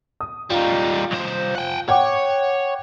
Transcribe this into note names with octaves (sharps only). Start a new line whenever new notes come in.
D#6
G3 D#4 F4
C2 C5
F#5 G5
C#5 F#5 G5 D6